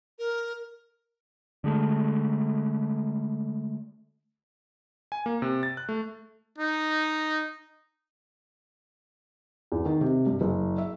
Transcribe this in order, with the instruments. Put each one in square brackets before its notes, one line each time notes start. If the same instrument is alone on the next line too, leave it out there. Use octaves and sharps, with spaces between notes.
[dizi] A#4
[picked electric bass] D3 G#3 A3
[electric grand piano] G#5
A#3
C3
A6
F#6
A3
[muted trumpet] D#4
[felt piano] E2
D#3
C3
G2
F#1
E5